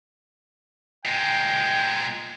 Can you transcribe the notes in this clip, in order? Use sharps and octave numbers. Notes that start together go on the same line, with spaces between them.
A#2 G#3 G5